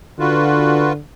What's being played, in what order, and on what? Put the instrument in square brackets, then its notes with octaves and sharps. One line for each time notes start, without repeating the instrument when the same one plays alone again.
[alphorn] D3 [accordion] F4 F#4 B4